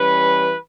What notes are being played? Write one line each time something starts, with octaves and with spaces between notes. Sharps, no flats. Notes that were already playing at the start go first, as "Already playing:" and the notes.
Already playing: E3 G3 C#4 B4